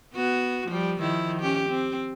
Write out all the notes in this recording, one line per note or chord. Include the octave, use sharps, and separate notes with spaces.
B3 F#4
F3 G3
D#3 F3 E4
C#4 G4
C4